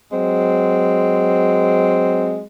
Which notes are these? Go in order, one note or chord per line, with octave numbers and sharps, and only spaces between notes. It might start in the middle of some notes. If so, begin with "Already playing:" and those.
F#3 G#3 C4